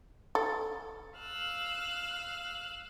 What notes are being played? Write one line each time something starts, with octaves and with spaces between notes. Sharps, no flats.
A4
F5 E6 F#6